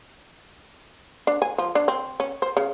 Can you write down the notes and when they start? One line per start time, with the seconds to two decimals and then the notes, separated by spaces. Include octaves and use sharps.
1.27 D4
1.42 G#5
1.58 F3
1.75 D4
1.88 C4
2.20 C#4
2.42 C5
2.57 C#3